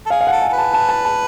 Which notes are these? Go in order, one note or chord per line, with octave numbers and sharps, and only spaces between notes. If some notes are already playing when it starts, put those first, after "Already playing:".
A4
G#4 F5
F5
A4 F#5
G#5
A4
B4
A5
A5
A5
A5